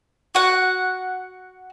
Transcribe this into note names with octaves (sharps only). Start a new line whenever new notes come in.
F#4 F#5